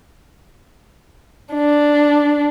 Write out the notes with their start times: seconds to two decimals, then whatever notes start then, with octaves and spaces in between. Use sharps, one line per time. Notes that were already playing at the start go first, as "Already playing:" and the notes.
1.54 D4